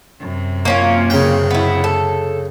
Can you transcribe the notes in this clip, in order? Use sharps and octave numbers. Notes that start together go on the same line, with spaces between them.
F#2 C3
A#3 C#4 F4
C#3 G5
B3 E4
A4